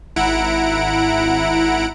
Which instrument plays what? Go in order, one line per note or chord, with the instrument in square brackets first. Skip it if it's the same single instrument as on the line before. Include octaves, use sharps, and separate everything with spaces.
[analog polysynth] G#1 E4 F#5 A#5 D7